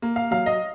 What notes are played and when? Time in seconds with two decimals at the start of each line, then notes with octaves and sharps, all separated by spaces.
0.02 A#3
0.16 F5
0.31 F#3 F5
0.46 D#5